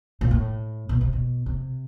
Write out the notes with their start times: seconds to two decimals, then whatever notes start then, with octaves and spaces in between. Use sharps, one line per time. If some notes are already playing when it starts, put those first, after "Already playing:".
0.21 A#2
0.31 A2
0.89 B2
1.01 C3
1.13 B2
1.46 C3